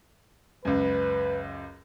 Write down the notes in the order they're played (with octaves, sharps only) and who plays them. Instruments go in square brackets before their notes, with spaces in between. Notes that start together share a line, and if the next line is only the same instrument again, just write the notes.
[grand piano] C#2 F#2 [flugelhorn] B4